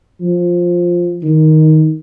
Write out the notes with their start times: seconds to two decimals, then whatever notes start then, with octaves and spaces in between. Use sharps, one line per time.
0.21 F3
1.23 D#3